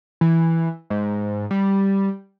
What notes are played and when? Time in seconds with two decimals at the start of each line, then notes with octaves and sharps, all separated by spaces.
0.21 E3
0.90 G#2
1.51 G3